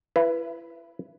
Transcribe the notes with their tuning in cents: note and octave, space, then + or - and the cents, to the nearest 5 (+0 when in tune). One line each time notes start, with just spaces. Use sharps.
E4 +35 B4 +0